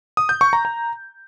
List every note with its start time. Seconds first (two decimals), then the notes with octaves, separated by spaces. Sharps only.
0.17 D#6
0.29 G6
0.41 C#6
0.53 A#5
0.65 A#5